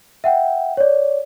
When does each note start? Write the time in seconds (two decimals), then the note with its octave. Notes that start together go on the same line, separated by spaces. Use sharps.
0.24 E5 F#5 G5
0.77 C#5 D5